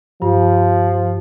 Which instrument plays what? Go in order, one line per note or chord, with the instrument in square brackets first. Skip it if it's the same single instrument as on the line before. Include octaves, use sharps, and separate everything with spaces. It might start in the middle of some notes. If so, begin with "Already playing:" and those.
[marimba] G2 [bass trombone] F3